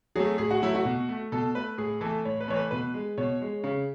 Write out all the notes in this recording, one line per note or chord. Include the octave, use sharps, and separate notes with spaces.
F#3 A3 G#4
A2 G#4
F#4
F#3 A3 E4
F#4
B2
A3
B2 A4
A3 B4
A2 G#4
E3 A3 A4
A2 C#5
B4
E3 A3 C#5
B4
B2 B4
G#3
B2 C#5
G#3
C#3